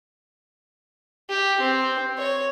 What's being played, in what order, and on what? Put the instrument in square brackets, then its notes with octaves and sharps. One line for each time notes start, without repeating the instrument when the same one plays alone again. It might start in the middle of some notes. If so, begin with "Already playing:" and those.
[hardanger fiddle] G4
C4
C#5